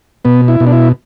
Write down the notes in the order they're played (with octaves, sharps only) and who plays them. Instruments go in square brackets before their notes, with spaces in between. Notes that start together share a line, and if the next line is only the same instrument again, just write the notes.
[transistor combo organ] B2 B3
E4
B2
D4
E4